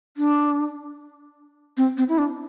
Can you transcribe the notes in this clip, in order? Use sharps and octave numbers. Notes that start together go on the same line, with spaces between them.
D4
C4
C4
E4
D4